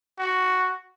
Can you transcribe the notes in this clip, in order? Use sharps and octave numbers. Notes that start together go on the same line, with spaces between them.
F#4